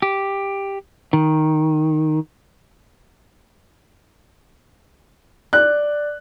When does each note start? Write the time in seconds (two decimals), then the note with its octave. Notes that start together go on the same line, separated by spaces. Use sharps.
0.02 G4
1.13 D#3
5.53 D5 F#6